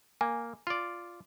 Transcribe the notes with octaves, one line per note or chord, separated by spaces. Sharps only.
A#3 G#5
F4 D5